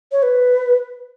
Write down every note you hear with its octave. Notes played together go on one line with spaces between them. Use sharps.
C#5
B4